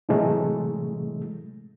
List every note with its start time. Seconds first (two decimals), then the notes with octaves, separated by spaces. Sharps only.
0.09 A2 C3 E3 F#3 G#3 A3